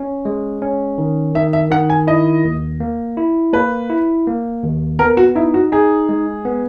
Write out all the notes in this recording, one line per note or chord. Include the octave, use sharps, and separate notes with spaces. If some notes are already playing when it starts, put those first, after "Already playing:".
Already playing: C#4
G#3
C#4
D#3
D#3 E5
E5
D#3 F#5
G#5
E4 D#5
D#2
A#3
E4
A#3 B4
E4
A#3
D#2
B3 A#4
F#4
D#4 E4
F#4
D#4 G#4
G#3
B3